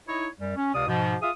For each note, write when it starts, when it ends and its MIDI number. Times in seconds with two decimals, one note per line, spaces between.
0.07 0.27 63
0.07 0.27 64
0.07 0.27 73
0.40 0.53 42
0.40 0.53 55
0.56 0.71 61
0.74 0.85 37
0.74 0.85 48
0.74 0.85 74
0.74 0.85 77
0.74 0.85 87
0.87 1.15 44
0.87 1.15 47
0.87 1.15 53
1.21 1.30 65
1.21 1.30 68
1.21 1.30 76
1.21 1.30 77
1.21 1.30 87